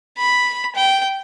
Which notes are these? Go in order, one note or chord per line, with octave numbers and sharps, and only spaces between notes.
B5
G5